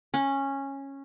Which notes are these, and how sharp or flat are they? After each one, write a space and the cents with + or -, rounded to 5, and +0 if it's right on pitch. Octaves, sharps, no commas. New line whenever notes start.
C#4 -10